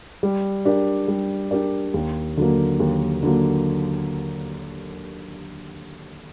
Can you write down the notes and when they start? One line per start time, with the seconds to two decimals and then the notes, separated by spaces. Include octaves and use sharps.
0.23 G3
0.65 D4 G4 A#4 D5
1.08 G3
1.51 D4 G4 A#4 D5
1.94 D#2
2.37 D3 F#3 A#3
2.80 D#2
3.23 D3 F#3 A#3